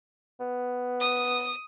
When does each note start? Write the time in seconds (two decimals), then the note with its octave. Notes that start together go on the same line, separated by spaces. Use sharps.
0.40 B3
0.99 D#6